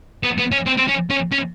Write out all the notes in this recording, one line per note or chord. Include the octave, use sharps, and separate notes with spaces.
B3
B3
C#4
C4
C4
C#4
C#4
C#4